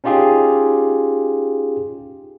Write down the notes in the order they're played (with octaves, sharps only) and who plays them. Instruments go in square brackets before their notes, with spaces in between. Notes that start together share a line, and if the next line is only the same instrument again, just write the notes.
[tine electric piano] C#4 D#4 F4 G4 G#4